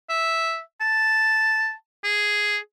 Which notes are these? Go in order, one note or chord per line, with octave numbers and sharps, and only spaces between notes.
E5
A5
G#4